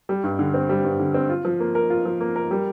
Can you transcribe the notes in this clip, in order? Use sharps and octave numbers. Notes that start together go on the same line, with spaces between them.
G3
G2
D3
C4
G3
G2
D3
C4
F4
F3
A#3
A#4
F4
F3
A#3
A#4
G3